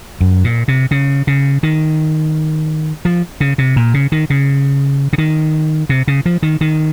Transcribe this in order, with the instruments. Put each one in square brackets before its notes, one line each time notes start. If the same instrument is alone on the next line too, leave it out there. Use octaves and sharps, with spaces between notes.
[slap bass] F#2
A#2
C3
C#3
C#3
D#3
F3
C#3
C3
A#2
C#3
D#3
C#3
C#3
D#3
C3
C#3
F3
D#3
D#3